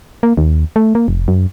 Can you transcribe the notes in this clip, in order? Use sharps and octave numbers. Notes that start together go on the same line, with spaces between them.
A#3
D#2
A3
A#3
F1
F#2